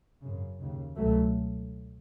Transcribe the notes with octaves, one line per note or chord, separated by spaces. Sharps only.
F#2 C#3
D#2 C#3
C#2 B2 F#3 A3